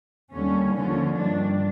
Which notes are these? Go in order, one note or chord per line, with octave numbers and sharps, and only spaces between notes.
D#2 D3 G3 C#4
D#2 D3 F3 C#4
G2 D#3 G3 D4